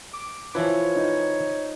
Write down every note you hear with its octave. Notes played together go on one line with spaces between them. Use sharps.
D6
E3 F3 E4 B4 C#5
D#4